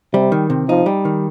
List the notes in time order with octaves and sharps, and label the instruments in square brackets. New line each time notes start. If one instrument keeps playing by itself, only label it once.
[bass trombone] C3 [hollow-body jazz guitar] G3
[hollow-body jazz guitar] D#3
C3
[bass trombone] F3 [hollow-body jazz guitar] D#4
[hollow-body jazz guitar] G3
D#3